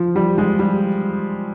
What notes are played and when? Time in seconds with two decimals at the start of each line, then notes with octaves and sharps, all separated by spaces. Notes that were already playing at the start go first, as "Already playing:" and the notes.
Already playing: F3
0.16 G3
0.38 G#3
0.59 G3